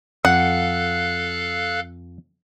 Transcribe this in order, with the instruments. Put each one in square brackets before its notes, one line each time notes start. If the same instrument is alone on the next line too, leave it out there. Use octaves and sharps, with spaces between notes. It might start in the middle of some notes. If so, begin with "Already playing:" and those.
[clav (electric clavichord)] F2 [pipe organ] A4 F5 F#6 [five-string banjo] F#5